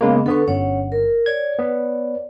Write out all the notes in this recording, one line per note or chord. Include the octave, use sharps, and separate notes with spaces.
C#3 G#3 A#3 B3 C#4
D3 B3 A4 C#6
G1 C#4 C#5 F#5
A#4
C#5 D5 G#6
B3